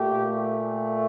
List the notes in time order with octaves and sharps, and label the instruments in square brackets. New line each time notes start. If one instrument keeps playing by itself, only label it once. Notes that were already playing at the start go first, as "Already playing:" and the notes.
Already playing: [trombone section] A#2 A3 G4